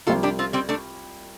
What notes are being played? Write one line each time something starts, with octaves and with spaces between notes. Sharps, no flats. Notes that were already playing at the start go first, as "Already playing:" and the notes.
C2 C3 F3 F4 A4
D4 G4
C4 F4
G3 C4
A3 D4